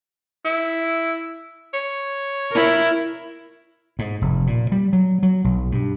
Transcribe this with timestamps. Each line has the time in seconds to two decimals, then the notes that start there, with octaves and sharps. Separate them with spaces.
0.45 E4
1.74 C#5
2.51 E4 A#4
3.99 G#2
4.22 F1
4.47 A#2
4.72 G3
4.93 F#3
5.23 F#3
5.44 B1
5.72 G2